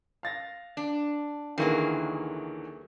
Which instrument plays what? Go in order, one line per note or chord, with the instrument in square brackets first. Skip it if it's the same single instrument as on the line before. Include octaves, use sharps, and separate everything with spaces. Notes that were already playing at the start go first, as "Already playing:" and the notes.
[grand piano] F5 A6 A#6
[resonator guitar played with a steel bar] D4
[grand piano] D2 D#3 E3 [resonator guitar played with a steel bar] F#3 A#3 G#4